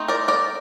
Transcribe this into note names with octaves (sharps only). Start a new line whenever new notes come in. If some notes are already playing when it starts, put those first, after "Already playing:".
Already playing: A3 C4 D#4
A#4 D5
A#4 D5